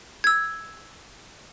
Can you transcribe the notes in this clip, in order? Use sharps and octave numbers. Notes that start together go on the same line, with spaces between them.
E6 G#6